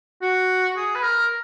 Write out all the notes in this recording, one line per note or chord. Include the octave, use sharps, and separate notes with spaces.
F#4
G#4
B4
A#4